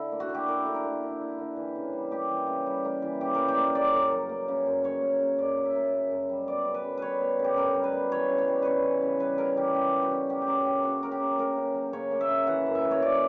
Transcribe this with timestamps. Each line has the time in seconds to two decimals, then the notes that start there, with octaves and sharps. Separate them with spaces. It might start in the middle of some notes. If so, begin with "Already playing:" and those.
Already playing: D3 E4
0.12 A#3
0.20 F#4
0.29 D3
0.35 G4
0.48 E4 A#4
0.66 D3
0.75 A#4
0.84 A#3
1.03 D3
1.21 E4
1.39 D3
1.56 E3
1.75 C#3
1.93 G3
2.11 A#3 G4
2.29 E3
2.47 C#3
2.66 G3
2.85 A#3
3.02 E3
3.21 C#3 G4
3.34 G3 A#4
3.48 G4
3.57 A#3
3.75 C#3 D5
3.93 F#2
4.11 F#3
4.29 A#3
4.48 C#3
4.66 F#2
4.84 F#3 C#5
5.02 A#3
5.20 C#3
5.39 F#2 D5
5.57 F#3
5.65 E5
5.76 A#3
5.93 C#3
6.11 F#2
6.29 G3
6.48 B3 D5
6.65 C#3
6.74 B4
6.84 F#2
6.98 G3 B4 C#5
7.21 B3
7.39 C#3
7.44 G4
7.56 F#2 A#4
7.75 G3
7.84 B4
7.93 B3
8.11 E3 C#5
8.29 C#3
8.38 C#5
8.48 G3
8.62 C#3 B4 C#5
8.83 E3
9.02 C#3
9.20 G3 B4
9.38 C#3 A#4
9.57 E3 G4
9.75 C#3 G4
9.93 G3
10.02 F#4
10.11 C#3
10.29 F#3 G4
10.42 G4
10.48 C#3 A#4
10.65 A#3 G4
10.83 C#3 F#4
11.02 F#3 A#4
11.11 G4
11.20 C#3
11.38 A#3 A#4
11.57 C#3
11.75 F#3
11.93 C#3 C#5
12.11 A#3
12.21 E5
12.29 C#3
12.47 E3 F#5
12.66 F#2
12.75 E5
12.84 A#3
12.91 C#5
13.02 C#4 D5